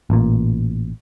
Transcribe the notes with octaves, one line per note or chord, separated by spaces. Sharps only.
A1 A#2